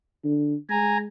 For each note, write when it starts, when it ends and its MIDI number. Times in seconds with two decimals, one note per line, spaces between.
0.24 0.55 50
0.70 1.05 56
0.70 0.97 80
0.70 0.97 82